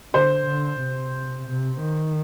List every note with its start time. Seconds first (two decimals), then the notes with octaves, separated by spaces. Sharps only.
0.14 D3 C5
0.47 D3
0.81 C3
1.48 C3
1.81 D#3